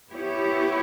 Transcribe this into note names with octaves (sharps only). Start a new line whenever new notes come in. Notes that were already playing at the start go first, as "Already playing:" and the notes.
B3 E4 G4 C#5